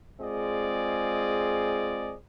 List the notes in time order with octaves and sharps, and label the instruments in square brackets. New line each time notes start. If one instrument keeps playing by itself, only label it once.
[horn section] G#3 C4 F4 G#4 D5 D#5